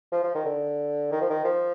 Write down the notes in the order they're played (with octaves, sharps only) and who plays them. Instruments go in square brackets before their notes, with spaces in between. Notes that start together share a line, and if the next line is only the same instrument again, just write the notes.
[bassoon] F3
F3
D#3
D3
D#3
F3
D#3
F3